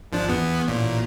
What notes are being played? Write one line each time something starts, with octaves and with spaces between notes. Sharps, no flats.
G#1 F3 D4
E2 B3
A1 A#2